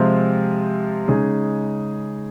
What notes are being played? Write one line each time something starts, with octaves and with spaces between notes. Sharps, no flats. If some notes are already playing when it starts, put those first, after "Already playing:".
Already playing: C3 F3 G#3 C4 F4
C#3 G#3 D#4 G#4